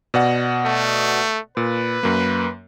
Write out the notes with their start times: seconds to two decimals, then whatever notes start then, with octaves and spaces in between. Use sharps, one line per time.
0.14 B2 D5 F#5
0.66 A3
1.57 A#2 B4
2.03 F#2 A#3